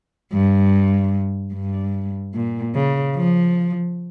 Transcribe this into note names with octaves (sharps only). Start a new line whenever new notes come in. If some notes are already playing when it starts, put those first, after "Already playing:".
G2
G2
A#2
C#3
F3